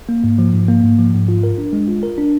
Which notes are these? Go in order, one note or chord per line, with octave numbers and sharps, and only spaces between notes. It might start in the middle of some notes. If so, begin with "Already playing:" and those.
A#3
G#2
F3
G#2
A#3
G#2
F3
G#2
F4
A#4
D4
G#3
F4
A#4
D4